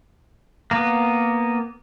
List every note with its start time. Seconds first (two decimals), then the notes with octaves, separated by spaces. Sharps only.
0.71 A#3 B3